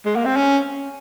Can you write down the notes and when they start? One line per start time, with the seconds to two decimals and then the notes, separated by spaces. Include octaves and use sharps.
0.05 G#3
0.16 A#3
0.25 C4
0.36 C#4